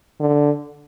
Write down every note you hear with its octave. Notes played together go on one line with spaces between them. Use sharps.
D3